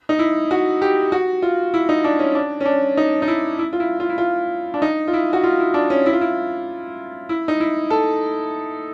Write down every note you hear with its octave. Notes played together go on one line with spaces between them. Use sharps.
D#4
E4
F#4
G4
F#4
F4
E4
D#4
D4
C#4
D4
C#4
D4
D#4
D#4
E4
E4
F4
E4
F4
E4
F4
D4
D#4
F4
E4
F#4
F4
E4
D4
C#4
E4
F4
E4
E4
D#4
E4
A4